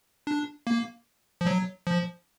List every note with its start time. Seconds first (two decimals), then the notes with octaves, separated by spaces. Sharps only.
0.27 D4
0.67 A#3
1.41 F3
1.46 F#3
1.87 F3